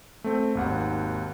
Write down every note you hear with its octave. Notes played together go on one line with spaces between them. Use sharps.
A3 C4
G#1 D#2 F#5